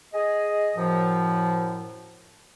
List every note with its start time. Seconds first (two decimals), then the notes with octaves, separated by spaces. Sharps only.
0.13 G#4 D#5
0.76 F#2 A2 F3